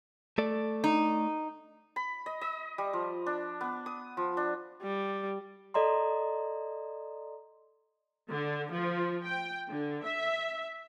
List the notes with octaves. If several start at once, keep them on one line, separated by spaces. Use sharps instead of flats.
A3 A4 D5
D#4
B5
D#5
D#5
G3
F3
D4
B3
D#6
F3
D4
G3
A4 D5 D#5 A#5 C6
D3
F3
G5
D3
E5